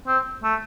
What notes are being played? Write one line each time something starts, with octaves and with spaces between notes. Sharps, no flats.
C4
A3